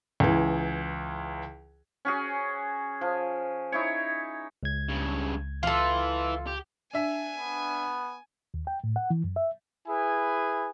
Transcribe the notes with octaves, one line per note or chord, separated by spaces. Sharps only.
C#2 E3
C#4 F#4 G#4
F3
D#4 E4 C#5
C#2 G#6
G2 C#3
E3 F4 A4
G4
D4 E5 G#5
B3
D#2
G5
A2
F#5
E3
F#2
E5
E4 G#4 B4 G#5